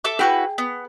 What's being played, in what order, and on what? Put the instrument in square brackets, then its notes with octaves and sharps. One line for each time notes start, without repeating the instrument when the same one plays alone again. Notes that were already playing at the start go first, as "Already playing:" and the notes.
[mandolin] A4 E5 D6
[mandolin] E4 F#4 B4 [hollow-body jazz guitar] G#4 G5
[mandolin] B3